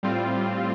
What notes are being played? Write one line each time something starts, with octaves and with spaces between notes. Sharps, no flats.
A2 G3 C4 F4